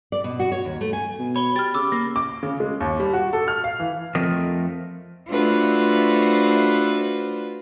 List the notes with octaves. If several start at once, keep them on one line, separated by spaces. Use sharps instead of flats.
D5
B2
F#4
C#5
D#2
A3
G#5
B2
C#5 B5 G7
G4 F6 A6
C#3 D6 E6
A#3 A#6
D6
C#3
G#3
D#2
G3
F#4
A4
F6
F5
E3
F2 F3 A3 C4 A#4 D#5
A3 D4 F4 F#4 B4 C5